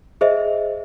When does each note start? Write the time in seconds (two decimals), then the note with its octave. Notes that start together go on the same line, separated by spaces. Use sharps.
0.21 G#4 C5 D#5 E5